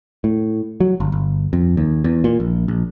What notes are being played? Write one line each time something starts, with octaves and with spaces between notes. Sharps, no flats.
A2
F#3
G1
G1
F2
D#2
E2
A#2
A#1
A#1